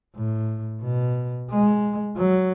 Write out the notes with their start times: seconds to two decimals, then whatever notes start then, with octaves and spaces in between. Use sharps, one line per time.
0.15 A2
0.82 B2
1.50 G#3
2.18 F#3